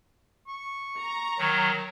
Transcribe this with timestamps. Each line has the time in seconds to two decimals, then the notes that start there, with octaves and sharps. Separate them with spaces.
0.48 C#6
0.99 A#5
1.38 D#3 F#3